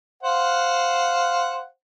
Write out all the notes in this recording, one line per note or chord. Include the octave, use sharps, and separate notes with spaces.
C5 F5 F#5